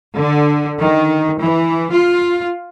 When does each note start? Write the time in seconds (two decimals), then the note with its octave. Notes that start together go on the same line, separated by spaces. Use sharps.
0.18 D3
0.81 D#3
1.41 E3
1.94 F4